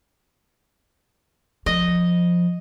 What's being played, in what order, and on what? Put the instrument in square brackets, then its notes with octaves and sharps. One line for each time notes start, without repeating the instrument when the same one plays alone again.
[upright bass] F3 [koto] D#5